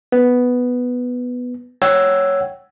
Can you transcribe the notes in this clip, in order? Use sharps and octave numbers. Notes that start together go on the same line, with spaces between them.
B3
C#5 F#5 G5 E6 G#6